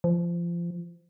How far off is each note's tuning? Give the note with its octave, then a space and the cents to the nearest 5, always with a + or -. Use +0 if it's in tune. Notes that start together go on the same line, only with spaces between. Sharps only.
F3 -25